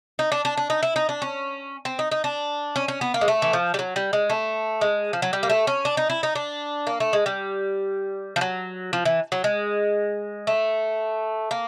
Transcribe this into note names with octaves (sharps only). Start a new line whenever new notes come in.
D#4
D4
D4
D4
D#4
E4
D#4
D4
C#4
C4
D#4
D#4
D4
C#4
C#4
B3
A#3
G#3
A3
E3
F3
G3
F#3
G3
G#3
A3
G#3
F3
F#3
G3
A#3
A3
C#4
D4
D#4
E4
D#4
D4
A#3
A3
G#3
G3
F3
F#3
F3
E3
F#3
G#3
A3
A#3